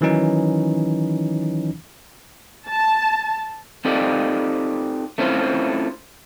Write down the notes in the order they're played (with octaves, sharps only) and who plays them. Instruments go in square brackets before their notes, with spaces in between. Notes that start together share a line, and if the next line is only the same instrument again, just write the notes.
[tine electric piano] D#3 E3 F#3 C#4 D#4
[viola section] A5
[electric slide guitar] C4 D#4 F4 G4 A4 D5
A3 C4 C#4 E4 F4 C5